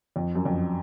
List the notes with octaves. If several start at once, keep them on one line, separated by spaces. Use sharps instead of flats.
F2
F#2
F2